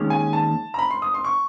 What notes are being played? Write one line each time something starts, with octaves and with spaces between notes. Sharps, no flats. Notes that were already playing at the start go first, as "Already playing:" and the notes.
Already playing: D#2 D#3 G#3 C#4
G#5
A5
A#5
B5
C6
D#6
C6
C#6